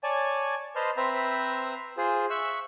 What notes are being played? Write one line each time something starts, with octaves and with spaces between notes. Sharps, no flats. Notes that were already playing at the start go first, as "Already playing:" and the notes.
C#5 D5 G#5 A5
B4 C5 D#5 A5 C6 F6
C4 B4 C5 E5 A#5
F4 G#4 C5
E5 C#6 E6 F#6